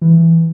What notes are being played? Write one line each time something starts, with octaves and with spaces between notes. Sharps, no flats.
E3